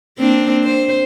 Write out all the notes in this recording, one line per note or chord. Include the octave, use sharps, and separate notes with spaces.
A#3 C4 D4
C5